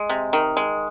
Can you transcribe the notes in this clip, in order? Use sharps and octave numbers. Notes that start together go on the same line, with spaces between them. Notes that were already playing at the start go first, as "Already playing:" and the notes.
Already playing: G#3
C3
D#3
G#3